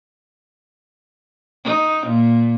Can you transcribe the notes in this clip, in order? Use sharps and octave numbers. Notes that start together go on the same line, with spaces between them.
D#4
A#2